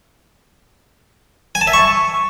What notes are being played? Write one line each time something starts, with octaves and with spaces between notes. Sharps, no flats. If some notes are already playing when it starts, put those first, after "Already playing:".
G#5
A5
E5
C#6